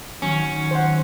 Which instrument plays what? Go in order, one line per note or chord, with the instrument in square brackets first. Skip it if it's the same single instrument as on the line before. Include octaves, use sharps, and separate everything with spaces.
[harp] D#3 F#3 [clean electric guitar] C#4
[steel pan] C5 F#5